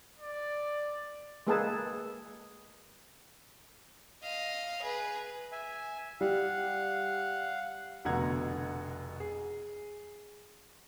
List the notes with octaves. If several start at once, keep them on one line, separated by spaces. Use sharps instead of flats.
D5
G#3 A#3 G#4 A4 B4 A5
D#5 F5
G#4 B4
E5 G#5
G3 F5 F#5
F1 B2 D3 F#5 A#5 G#6
G#4